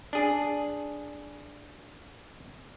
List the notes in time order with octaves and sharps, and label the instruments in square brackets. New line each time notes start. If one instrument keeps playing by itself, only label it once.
[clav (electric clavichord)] D4 G#4